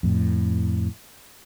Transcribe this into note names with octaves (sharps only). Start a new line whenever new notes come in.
F2 A2